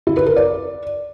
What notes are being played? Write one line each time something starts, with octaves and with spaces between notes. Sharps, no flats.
E4
B4
A#4
D5